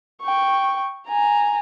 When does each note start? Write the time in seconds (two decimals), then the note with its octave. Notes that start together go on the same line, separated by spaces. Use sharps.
0.22 G5 C#6
1.07 G#5 A#5